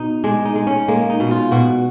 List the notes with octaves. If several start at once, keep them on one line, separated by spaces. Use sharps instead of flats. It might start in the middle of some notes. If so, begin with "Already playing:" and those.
Already playing: B2 D#4
G#3 D4
D#4
G#3
C#4
G#3 A#3
D#4
B2
F4
B2 F#4